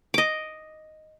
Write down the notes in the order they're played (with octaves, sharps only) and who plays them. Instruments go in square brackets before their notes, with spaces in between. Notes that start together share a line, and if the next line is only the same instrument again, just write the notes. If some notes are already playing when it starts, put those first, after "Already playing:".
[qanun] D#5 D6